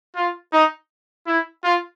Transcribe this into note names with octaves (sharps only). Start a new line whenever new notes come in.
F4
D#4
E4
F4